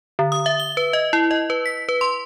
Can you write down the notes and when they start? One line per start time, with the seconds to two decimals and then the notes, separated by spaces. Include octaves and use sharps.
0.19 D3
0.32 D#6
0.46 E5
0.60 G7
0.77 B4
0.93 D#5
1.13 E4
1.31 D#5
1.50 B4
1.66 B6
1.89 B4
2.01 C6